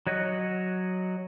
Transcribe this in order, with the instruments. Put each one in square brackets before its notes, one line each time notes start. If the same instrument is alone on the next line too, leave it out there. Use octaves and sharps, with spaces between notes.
[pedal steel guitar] F#3 C#5 D#5 F#5